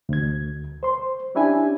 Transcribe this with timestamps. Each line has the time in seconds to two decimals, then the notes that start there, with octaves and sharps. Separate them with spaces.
0.09 D2 G#6
0.83 C5 C6
1.35 C#4 D4 E4 G4 G#5